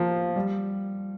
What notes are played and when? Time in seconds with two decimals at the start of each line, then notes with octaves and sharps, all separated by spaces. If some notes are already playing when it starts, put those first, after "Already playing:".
Already playing: F3 A#3
0.36 G3